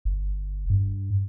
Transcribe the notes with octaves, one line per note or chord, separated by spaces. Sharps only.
G1
G2